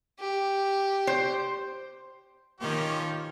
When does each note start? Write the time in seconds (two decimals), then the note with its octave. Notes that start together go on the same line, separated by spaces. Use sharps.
0.20 G4
1.07 C5
2.61 D#3 F3 C#4 G4